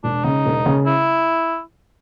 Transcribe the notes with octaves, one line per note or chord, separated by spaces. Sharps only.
E1 D4
C#3 D#4
E1
C#3
E4